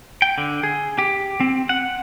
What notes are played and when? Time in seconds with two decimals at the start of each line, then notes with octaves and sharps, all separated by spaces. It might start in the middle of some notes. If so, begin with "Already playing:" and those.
0.22 G5
0.38 D3
0.63 G#4
0.98 G4
1.40 C4
1.69 F#5